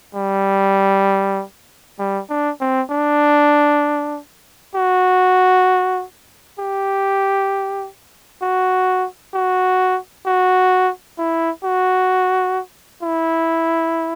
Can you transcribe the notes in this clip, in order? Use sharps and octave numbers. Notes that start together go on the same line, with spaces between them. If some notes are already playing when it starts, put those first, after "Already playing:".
G3
G3
D4
C4
D4
F#4
G4
F#4
F#4
F#4
E4
F#4
E4